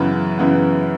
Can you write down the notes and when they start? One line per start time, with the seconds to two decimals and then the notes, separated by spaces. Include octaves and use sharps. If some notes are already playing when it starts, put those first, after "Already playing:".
Already playing: F#2 C#3 E3 B3 B4
0.38 F#2 C#3 E3 B3